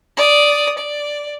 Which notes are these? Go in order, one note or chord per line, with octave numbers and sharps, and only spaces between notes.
D5 D#6
D5